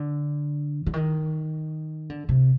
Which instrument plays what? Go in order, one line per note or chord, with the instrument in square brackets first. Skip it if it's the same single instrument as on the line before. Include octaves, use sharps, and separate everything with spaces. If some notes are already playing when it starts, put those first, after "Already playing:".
Already playing: [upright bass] D3
D3
D#3
D3
C3